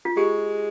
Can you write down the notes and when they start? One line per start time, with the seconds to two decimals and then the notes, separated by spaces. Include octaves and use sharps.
0.05 F4
0.17 G#3 G4